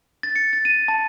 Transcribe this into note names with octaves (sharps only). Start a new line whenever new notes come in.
A6
C#7
A6
D#7
A5